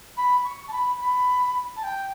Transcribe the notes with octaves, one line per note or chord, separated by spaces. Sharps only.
B5
C#6
A5
B5
B5
A5
G5